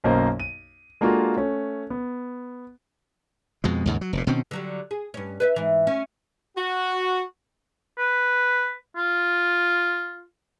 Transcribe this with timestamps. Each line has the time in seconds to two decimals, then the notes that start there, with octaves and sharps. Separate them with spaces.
0.04 B1 F#2 A#3 C5 D#5
0.40 D#7
1.01 G#3 A#3 D4 F4 F#4 A4
1.37 A3 C#4
1.90 B3
3.64 F2 B2 G#3
3.86 D#2 G#2 C#3
4.01 F#3
4.13 F1 A#2
4.27 B2 D#3 C4 C#4
4.51 D3 F#3 G3
4.91 G#4
5.14 G2 C#4
5.40 B4 D5 E5
5.56 G#2 E3
5.87 C#4
6.57 F#4
7.98 B4
8.96 F4